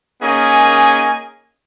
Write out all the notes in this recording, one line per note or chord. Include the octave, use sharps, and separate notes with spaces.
A#3 C#4 D#4 G#4 D#5 G#5